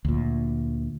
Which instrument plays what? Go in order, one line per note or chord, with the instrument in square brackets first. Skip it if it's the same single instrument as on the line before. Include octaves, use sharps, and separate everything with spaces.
[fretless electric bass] D2 A#2